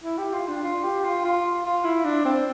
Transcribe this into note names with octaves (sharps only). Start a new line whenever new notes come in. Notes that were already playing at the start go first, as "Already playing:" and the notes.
E4
G4
F4
D4
F4
G4
F4
F4
F4
E4
D4
C4